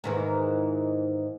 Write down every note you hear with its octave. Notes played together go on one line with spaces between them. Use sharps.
G#2 D#3 E3